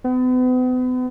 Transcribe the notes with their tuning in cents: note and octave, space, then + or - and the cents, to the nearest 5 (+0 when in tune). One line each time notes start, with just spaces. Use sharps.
B3 +40